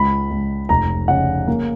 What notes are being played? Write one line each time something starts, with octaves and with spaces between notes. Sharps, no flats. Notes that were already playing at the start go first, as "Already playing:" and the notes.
Already playing: C#2 B5
C#2
F1 A#5
C#3 F#5
A#3